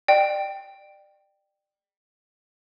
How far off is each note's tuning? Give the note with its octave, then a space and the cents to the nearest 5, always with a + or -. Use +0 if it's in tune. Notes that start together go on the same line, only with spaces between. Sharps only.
D5 +30 G5 +0